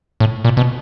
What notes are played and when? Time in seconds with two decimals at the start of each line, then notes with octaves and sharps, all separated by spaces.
0.20 A2
0.45 A#2
0.57 B2